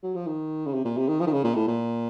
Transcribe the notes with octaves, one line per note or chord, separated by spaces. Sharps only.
F#3
F3
D#3
C#3
C3
A#2
C3
D#3
F3
D#3
C#3
A#2
A2
A#2